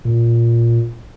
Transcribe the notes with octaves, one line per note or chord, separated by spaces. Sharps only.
A#2